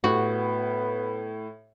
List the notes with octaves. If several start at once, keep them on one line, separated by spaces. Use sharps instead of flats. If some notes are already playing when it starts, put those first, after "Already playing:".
A2 B3 F#4